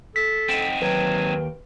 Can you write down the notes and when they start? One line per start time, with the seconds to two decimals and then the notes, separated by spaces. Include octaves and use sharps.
0.16 A4 B6
0.49 C4 D#4 F#5 G5
0.82 D#2 F#3 B4 G5